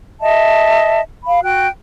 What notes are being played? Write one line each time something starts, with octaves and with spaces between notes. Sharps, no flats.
D#5 E5 A5
F5 B5
F#4 G5 F#6